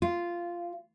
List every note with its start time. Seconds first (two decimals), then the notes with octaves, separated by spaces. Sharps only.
0.02 F4